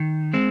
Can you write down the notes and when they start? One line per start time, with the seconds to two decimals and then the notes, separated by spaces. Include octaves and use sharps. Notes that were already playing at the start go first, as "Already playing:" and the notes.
Already playing: D#3
0.33 G#3 C4